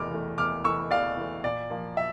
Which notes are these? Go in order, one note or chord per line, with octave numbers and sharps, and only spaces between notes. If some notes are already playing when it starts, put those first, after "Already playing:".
Already playing: E2 E3 A3 D6 F6
E3 A3
E2 D6 F6
E3 A3 C#6 E6
E2 D5 F5
E3 A3
A#2 D5
F3 A#3
E5